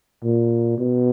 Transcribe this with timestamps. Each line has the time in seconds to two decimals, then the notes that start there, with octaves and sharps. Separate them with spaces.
0.24 A#2
0.78 B2